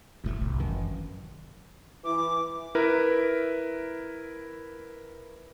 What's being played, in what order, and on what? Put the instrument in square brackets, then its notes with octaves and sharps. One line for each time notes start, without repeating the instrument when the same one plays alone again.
[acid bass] F#1 [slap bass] D2 A2 A3
[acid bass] G1 [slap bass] C2
[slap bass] F#2 D#3 E3
[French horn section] E3 [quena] D6
[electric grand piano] E4 A#4 B4